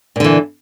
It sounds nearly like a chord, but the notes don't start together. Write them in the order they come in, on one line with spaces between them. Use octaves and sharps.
A#2 D3 E3